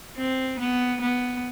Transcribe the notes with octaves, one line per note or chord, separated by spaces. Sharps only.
C4
B3
B3